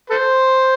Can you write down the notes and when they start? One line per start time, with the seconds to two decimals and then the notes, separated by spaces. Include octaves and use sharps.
0.10 A4 C5